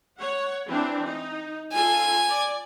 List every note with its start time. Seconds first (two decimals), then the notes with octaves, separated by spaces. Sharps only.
0.18 C#5 F#5
0.68 E3 C4 D4
1.06 D#4
1.72 F4 A4 G#5
2.29 D5